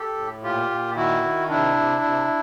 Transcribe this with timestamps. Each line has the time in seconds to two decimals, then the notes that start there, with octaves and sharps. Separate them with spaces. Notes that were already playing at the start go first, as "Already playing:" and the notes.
Already playing: G4 A4
0.16 A2
0.43 A#2 F4 G4
0.70 A#2
0.96 D#3 E4 F#4
1.22 D#3
1.49 C3 D4 E4
1.76 C3
2.02 C3